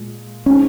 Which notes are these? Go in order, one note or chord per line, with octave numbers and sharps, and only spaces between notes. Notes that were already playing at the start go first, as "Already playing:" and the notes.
Already playing: A#2 G#3
G#3 C4 C#4 D#4